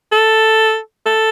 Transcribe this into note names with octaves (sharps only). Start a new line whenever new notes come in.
A4
A4